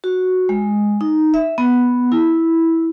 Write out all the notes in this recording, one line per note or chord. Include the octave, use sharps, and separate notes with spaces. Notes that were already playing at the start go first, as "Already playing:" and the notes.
F#4
G#3
D#4
E5
B3
E4